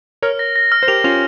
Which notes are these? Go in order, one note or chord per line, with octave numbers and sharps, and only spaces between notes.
A#4 C#5 F6
A#6
A#6
F6
C5
G4 A#4 F7
C#4 F4 F7